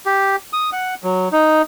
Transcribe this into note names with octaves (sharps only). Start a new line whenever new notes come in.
G4
D#6
F#5
F#3
D#4